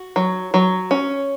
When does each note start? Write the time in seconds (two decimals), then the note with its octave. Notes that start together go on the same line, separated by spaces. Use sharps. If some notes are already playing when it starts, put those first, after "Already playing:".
Already playing: F#4
0.16 F#3
0.54 F#3
0.91 C#4